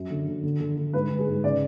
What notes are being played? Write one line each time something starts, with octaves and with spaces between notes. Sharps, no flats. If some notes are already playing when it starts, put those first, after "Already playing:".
Already playing: F#2
D3
D3
D3
D3
D3
G#2 B4
G#2
G#4
G#2
C#3 D5